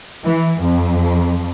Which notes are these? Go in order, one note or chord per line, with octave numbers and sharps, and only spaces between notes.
E3
F2